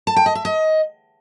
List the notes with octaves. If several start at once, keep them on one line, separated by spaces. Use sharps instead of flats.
A5
G5
D#5
E5
D#5